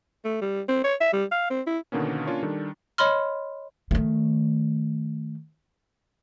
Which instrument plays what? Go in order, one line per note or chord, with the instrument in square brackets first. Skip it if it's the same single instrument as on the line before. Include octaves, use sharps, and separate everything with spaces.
[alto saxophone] A3
G3
C4
C#5
E5
G3
F5
C4
E4
[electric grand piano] B2 D3 D#3 A#3 B3 C#4
A#3 C#4 D4 F4 C#5
D#3 G3 D4 A4
[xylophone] C#5 D#5 B5 C6 F6
[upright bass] D#3 A3